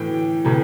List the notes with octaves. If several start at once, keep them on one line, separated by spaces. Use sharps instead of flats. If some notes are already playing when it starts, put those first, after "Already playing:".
Already playing: A2 E3 G5
A2 E3